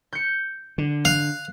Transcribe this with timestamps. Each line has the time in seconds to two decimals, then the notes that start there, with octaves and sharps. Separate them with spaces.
0.13 G6 C#7
0.78 D3
1.05 F5 F#6